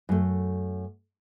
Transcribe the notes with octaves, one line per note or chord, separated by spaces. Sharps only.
F#2 A3